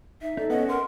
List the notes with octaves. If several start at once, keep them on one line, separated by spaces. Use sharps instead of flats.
D#4 E5
D#4 A4 D5
B3 C#4 D#5 F#5
A#4 C6